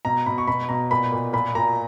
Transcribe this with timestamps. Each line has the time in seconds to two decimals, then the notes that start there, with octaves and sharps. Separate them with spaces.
0.05 B2 A#5
0.26 B2 B5
0.38 C#6
0.47 B2 B5
0.69 B2 A#5
0.91 A#2 B5
1.12 A#2
1.33 A#2 B5
1.55 A#2 A#5